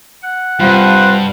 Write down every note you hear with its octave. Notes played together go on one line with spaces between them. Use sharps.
F#5
G2 C3 G3 F4 B4 C5 F#5